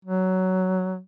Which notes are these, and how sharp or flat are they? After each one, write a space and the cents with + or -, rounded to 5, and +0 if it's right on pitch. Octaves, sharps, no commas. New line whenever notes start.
F#3 +10